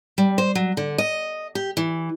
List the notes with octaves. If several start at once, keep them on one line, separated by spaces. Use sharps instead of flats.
G3
C5
F#3
D3
D#5
G4
E3